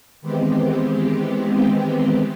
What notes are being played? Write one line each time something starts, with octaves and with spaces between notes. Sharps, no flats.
D#3 E3 G#3 B3 C4 G4